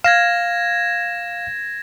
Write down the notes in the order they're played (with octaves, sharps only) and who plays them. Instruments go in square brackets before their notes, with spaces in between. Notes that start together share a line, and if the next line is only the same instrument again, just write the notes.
[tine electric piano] F5 [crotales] G#6 A#6 E7